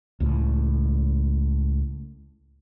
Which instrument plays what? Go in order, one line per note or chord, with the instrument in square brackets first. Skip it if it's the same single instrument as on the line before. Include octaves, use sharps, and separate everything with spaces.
[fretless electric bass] C#2 A2